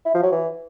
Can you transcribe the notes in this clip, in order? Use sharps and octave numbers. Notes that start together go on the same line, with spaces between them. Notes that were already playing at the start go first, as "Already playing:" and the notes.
E4
F3
F#3
E3